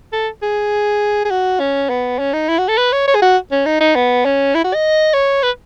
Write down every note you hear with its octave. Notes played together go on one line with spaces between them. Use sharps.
A4
G#4
G#4
F#4
C#4
B3
C#4
D#4
E4
F#4
A4
B4
C#5
C#5
G#4
F#4
C#4
D#4
D#4
B3
C#4
E4
F#4
D#5
C#5
B4